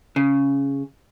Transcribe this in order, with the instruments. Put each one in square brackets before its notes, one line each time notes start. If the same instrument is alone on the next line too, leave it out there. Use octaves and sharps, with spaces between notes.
[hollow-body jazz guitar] C#3